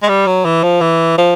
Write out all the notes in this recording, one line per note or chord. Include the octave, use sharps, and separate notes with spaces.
G#3
G3
F#3
E3
F3
E3
F3